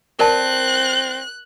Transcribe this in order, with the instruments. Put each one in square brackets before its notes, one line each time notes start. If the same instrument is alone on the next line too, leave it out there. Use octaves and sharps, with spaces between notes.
[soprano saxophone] C4 [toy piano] A#4 D5 A5 [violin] F#6